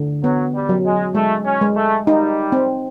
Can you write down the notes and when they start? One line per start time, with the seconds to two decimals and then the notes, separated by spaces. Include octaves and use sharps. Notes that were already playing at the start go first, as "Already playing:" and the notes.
Already playing: D3
0.23 F#3 B3
0.55 G3
0.69 F#3
0.85 G#3
1.15 G#3 A3
1.46 C#4
1.61 G#3
1.76 A3
2.07 G3 D#4
2.52 C4